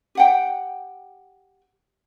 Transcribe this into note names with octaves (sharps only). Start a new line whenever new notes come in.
G4 F#5 G5